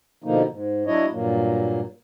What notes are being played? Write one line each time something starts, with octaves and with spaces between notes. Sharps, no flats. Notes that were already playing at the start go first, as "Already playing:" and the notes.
B2 D3 F3 A#3 D#4
G#2
F#3 D4 E4 C#5 D#5
G2 A#2 F#3 A#3